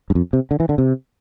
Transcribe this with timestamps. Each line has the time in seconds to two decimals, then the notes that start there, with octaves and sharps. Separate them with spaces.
0.10 G2
0.15 F2
0.33 C3
0.51 D3
0.60 E3
0.69 D3
0.78 C3